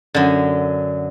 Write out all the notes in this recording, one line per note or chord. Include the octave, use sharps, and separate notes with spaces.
F#2 D3